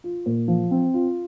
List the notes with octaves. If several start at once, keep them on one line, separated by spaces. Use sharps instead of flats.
F4
A#2
F3
C4
F4